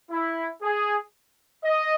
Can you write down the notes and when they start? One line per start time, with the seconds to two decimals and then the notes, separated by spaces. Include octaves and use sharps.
0.11 E4
0.62 G#4
1.64 D#5